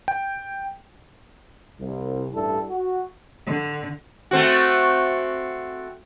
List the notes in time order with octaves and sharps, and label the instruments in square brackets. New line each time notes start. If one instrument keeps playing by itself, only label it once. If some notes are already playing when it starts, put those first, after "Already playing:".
[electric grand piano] G5
[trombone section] C2
A1 G2 G3 E4 A4
F#4
[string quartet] D3
[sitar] A3 C4 F#4